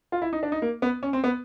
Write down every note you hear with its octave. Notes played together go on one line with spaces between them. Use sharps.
F4
E4
D#4
D4
D#4
A#3
B3
C#4
C4
B3